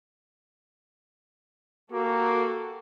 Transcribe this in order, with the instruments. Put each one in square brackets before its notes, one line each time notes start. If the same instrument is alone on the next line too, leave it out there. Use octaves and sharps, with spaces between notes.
[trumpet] A#3 [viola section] F#4 G4 A4